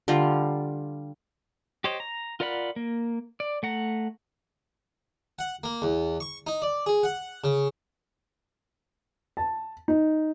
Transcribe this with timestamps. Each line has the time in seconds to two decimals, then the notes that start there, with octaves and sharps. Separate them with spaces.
0.08 D3 G3 F4 A#5
1.84 G4 C5 C#5 D#5
2.00 A#5
2.40 F4 A#4 D5 F#5 B5
2.76 A#3
3.40 D5
3.63 A3 F#5 A#5
5.39 F#5
5.64 A#3
5.82 E2
6.20 C#6
6.47 D#4
6.62 D5
6.86 G#4
7.03 F#5
7.44 C#3
9.37 A5
9.88 D#4